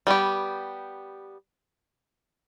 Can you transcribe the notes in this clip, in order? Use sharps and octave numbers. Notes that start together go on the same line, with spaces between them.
G3 B3 G4